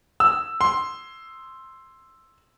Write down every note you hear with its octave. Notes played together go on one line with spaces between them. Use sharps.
E6
C6